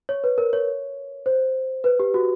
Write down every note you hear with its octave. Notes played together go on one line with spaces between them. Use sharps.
C#5
B4
A#4
C#5
C5
B4
G4
F#4